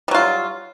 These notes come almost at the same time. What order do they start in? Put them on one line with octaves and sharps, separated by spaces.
G3 F#3 F4